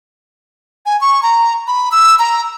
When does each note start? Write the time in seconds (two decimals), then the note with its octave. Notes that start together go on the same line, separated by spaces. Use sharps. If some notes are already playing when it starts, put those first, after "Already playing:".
0.86 G#5
1.01 C#6
1.23 A#5
1.67 B5
1.92 E6
2.19 A#5